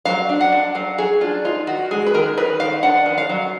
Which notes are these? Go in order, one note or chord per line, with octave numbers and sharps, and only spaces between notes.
F#3 F5
D4
F#5
D4
F#3 F5
F#3 G#4
D4 F4
D#4 F4
D#3 F#4
G#3 G#4
B4
D#3 A#4
D#4 B4
D#3 F5
D4 F#5
D#3
F5
F#3